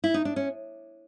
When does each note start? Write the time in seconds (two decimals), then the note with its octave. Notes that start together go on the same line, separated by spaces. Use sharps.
0.04 E4
0.14 D#4
0.25 D4
0.36 C#4